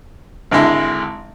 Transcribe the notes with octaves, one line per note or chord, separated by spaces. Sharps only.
G#1 D3 G#3 E4